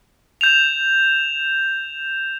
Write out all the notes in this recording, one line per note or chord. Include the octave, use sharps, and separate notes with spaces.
G6 E7 F7